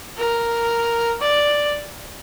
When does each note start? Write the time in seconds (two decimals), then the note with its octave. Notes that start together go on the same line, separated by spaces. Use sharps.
0.18 A#4
1.21 D5